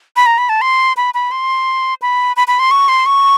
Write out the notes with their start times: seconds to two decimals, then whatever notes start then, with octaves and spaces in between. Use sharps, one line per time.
0.16 B5
0.26 A#5
0.38 B5
0.49 A5
0.61 C6
0.97 B5
1.14 B5
1.31 C6
2.02 B5
2.36 B5
2.48 B5
2.59 C6
2.71 C#6
2.88 C6
3.06 C#6